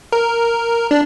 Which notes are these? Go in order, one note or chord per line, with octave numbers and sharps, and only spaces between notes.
A#4
D4